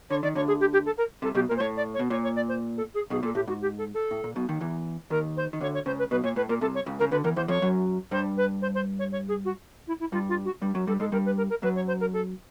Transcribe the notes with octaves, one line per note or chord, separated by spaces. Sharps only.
D3 C#5
D#3 D5
D2 D3 C#5
G#4
G4
G4
A4
A#4
C2 C3 A4
B1 B2 G4
A#4
A#2
C5
A2 C#5
D5
C#5
B2
A#2 C#5
C#5
D5
C5
A4
G#4
B1 B2 G#4
A#2 A4
A2 G4
G#2 F#4
G4
A4
A4
A2
A#2
B1 B2
D#2 D#3
E2 E3
D#2 D#3 A#4
C5
D#3
D2 D3 C#5
C#5
C#2 C#3 C5
B4
B1 B2 B4
A#2 C#5
A2 B4
A#2 A#4
C2 C3 A4
C#5
C#2 C#3
C#3 A#4
D2 D3 B4
E2 E3 A#4
E2 E3 C5
F2 F3 C#5
F#2 F#3
G2 G3 C5
B4
C5
C5
C#5
C#5
G#4
F#4
E4
E4
G2 G3 F4
F4
F#4
G2 G3
F#2 F#3
G2 G3 A4
G#2 G#3 A4
G2 G3 A#4
B4
A#4
A#4
F#2 F#3 B4
C#5
C5
A#4
A4